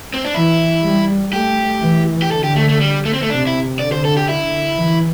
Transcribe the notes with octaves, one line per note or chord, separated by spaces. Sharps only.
C4
D4
E3 E4
G3
A3 G4
E3
G4
D3 A4
G4
A3
A3
G3
A3
C4
A3
C3 D4
E4
D3 D5
C5
A4
G4
E4
E3